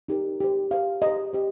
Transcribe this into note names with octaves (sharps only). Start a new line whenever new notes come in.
D#4 G4 A#4
G4 C5
G4 C5 F5
G4 C5 D#5
G4 C5